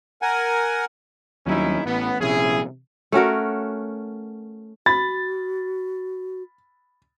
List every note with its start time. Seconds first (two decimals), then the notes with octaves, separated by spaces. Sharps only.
0.22 A#4 F#5 G#5
1.46 D#2 F#3 G3 C#4 D#4 E4
1.86 A1 B3
2.20 A#1 C3 C#4 E4 G#4
3.12 A3 C#4 F#4 A#4
4.86 F#4 B5 A6